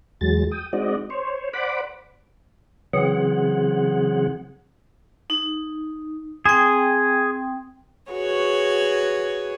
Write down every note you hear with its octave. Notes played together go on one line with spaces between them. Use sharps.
E2 F#3 G#3 A6
G5 D#6
G#3 C4 D#4 F#4 D5 D#5
C5 C#5
C5 D5 F#5 B5 D6
C#3 E3 F#3 C4 G#4 F#5
D#4
C4 G#4 G5
F#4 G#4 B4 C#5